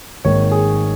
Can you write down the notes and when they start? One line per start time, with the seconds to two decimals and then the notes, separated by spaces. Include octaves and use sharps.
0.25 G#1 G#2 D#3 A#3 C#5
0.52 G#4